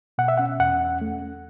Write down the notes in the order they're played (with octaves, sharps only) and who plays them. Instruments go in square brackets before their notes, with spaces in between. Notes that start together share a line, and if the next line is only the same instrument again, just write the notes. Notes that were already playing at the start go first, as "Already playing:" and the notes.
[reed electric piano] B2 F#5
E5
C#4 F#5
E2 F#5
C#4
A3
A3